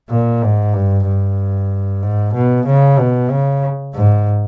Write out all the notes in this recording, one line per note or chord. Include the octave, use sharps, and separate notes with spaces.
A#2
G#2
G2
G2
G#2
B2
C#3
B2
C#3
G#2